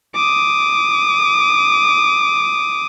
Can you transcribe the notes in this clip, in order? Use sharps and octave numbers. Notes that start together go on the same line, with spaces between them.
D6 D#6